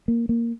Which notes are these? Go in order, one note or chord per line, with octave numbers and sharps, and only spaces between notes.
A#3
A#3